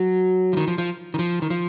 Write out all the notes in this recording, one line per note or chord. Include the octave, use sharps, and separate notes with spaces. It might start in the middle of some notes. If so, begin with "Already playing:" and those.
Already playing: F#3
F3
D#3
F3
F3
D#3
F3
D#3
F3